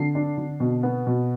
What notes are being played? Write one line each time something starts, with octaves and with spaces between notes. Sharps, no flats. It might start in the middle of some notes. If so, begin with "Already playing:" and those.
Already playing: D3 C7
D4
D3
B2
B3
B2